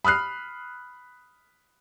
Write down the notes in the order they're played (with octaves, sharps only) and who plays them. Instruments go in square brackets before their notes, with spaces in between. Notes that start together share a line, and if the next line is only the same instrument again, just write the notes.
[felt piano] B5 D#6 F6 F#6 C7